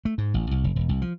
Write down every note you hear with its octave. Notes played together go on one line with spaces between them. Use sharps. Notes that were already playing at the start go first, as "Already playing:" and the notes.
A3
G#2
A1
C2
F#1
E1
C2
F3